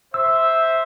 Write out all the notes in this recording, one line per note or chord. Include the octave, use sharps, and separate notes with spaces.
C5 E5 E6